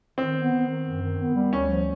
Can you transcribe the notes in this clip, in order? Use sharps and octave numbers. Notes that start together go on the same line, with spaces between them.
D#3 C4
B3
D#3
D#3
F#2
D#3
B3
G3
D2 C#4
F3